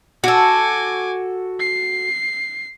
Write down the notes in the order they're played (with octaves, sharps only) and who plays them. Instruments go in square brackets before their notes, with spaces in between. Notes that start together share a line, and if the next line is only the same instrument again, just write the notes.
[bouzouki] F#4 A4 [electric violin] G#5 D6
[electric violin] C7